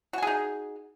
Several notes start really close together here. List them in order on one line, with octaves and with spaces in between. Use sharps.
F#4 G#5 G#4 D#4